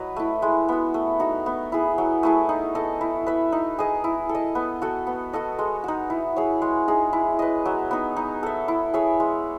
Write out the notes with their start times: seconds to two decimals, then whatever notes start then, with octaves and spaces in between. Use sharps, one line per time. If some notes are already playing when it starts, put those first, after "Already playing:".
Already playing: F#3 B4 D#5
0.16 A3 E4
0.42 G#3
0.69 B3 F#4
0.94 A3
1.20 D#4 F#4
1.46 B3
1.72 E4 G#4
1.98 F#3
2.23 A3 E4 G#4
2.49 D#4
2.75 A4 D#5
3.01 E4
3.27 B4 E5
3.52 D#4
3.79 G#4 D#5
4.04 E4
4.29 A4
4.35 D#5
4.55 B3
4.82 F#4 A4
5.07 B3
5.33 F#4 A4 D#5
5.59 G#3
5.84 D#4 F#4
6.10 E4
6.36 G#4 C#5
6.62 G#3
6.88 D#4 G#4
7.13 E4
7.39 B4 D#5
7.65 F#3
7.91 B3 D#4
8.16 D#4
8.43 A4 E5
8.68 E4
8.94 G#4 C#5 E5
9.20 G#3